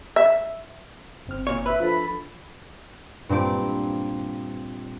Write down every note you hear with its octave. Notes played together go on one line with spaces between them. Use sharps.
E5
G1 C4 F6
A#2 C#5
B4 E5
F3 D4 A4 B5
G2 A#2 C4 D6 D7